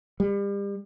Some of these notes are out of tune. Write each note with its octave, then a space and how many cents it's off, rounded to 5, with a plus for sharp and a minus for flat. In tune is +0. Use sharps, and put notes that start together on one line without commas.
G3 +35